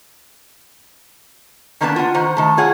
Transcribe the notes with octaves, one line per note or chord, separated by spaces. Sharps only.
D#3 A#3 B3 D4 B4 A5
F4 F#5
D#3 C5 F#5 A#5
D#3 A3
F4 G#4 C#5 F#5